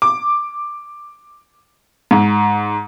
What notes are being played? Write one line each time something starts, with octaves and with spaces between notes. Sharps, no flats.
D6
G#2